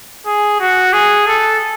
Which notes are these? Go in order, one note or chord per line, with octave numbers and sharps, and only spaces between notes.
G#4
F#4
G#4
A4